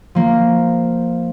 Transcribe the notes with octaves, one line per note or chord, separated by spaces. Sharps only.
F3 A#3